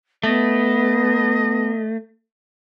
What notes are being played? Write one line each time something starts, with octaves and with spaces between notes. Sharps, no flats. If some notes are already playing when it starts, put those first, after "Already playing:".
A3 B3 D#5